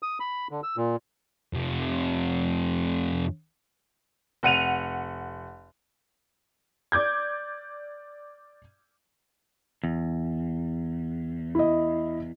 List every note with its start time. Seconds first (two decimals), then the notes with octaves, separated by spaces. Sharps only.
0.03 D#6
0.20 B5
0.51 D3
0.63 E6
0.77 A#2
1.53 F2 C3
4.43 F1 F#5 D#7 F7
6.92 D5 D6 G6 G#6
9.84 E2
11.55 E4 D#5